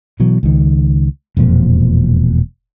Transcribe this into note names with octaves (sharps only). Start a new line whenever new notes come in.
B2 E3 F#3
C#2 D#3
E1 F2 A#2 F3